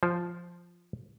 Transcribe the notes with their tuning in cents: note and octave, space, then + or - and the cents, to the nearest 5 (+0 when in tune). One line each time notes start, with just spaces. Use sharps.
F3 +0 C5 +0